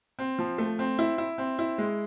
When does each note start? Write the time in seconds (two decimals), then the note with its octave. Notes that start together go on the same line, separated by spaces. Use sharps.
0.19 C4
0.39 F3
0.58 A3
0.79 C4
0.99 E4
1.18 E4
1.38 C4
1.59 E4
1.78 G#3